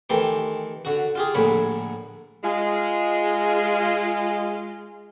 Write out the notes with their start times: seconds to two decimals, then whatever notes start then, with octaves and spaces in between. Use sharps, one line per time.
0.10 D#3 E3 A3 G4 C6
0.85 D3 F#4
1.15 F4 G4 G#4
1.34 A#1 A2 D3 C#5 B5
2.43 G#3 F4